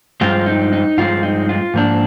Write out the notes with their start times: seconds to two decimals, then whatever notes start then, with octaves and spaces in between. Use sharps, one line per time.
0.21 G2 F3 G#3 C4 F4
0.46 D#4
0.73 D#4
0.98 G2 F3 G#3 C4 F4
1.23 D#4
1.49 F4
1.74 G#2 F3 A#3 D4